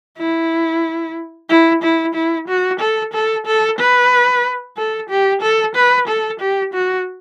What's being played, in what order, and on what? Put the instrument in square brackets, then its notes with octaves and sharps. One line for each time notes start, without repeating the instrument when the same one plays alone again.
[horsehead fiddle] E4
E4
E4
E4
F#4
A4
A4
A4
B4
A4
G4
A4
B4
A4
G4
F#4